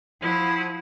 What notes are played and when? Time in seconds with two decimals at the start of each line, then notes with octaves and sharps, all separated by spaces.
0.21 F3 E4 F#5 D#6